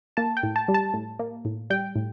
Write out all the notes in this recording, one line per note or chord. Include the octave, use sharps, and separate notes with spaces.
A#3 A5
G5
A2
A5
G3
A5
A2
A#3
A2
G3 G5
A2